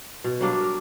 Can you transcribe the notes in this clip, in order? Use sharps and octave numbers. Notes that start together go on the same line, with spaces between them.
B2
F#3 G3 A#3 D4
A#4